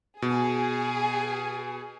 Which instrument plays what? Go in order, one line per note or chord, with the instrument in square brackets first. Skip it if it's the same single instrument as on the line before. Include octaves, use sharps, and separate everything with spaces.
[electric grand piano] B2 [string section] G#4